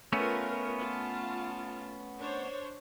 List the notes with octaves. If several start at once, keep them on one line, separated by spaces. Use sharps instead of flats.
A3 B3 C#4 F4 A#4 B4
F4 A5
D4 C5 C#5